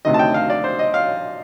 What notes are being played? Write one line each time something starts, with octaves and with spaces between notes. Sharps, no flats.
D2 C3 D#3 D#5
A5
G5
F5
D5
C5
D#5
F5